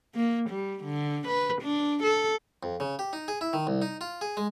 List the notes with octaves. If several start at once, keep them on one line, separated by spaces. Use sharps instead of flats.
A#3
G3
D3
B4
D4
A4
F2
C#3
G4
D#4
G#4
E4
D#3
C2
D#4
F4
G#4
G#3